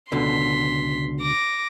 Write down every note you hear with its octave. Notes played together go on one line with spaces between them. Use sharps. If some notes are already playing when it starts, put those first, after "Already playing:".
C#2 B2 D3 C6 B6
D6 A#6